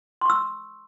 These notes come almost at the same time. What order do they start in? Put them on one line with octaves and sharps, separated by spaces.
C6 C#6 E6